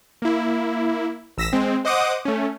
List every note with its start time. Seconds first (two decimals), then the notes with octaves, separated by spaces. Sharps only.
0.22 A#3 E4
1.37 A1 E6 A#6 B6 E7
1.53 G#3 C4
1.85 C5 D#5 F#5 D6 D#6
2.25 A3 C#4